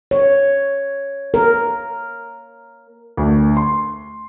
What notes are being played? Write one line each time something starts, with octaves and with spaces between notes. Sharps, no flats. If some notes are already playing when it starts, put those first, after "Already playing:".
C#5
A#4
D2
C6